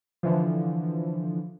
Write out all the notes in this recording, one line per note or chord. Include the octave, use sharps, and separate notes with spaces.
D3 E3 F3